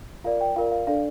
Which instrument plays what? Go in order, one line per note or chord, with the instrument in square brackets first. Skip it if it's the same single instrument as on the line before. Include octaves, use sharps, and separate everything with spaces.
[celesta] F4 A#4 D5 F5
G5
F4 A#4 D5 F5
F5
D4 A4 D5 F5